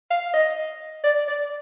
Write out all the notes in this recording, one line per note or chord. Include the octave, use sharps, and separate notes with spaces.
F5
D#5
D5
D5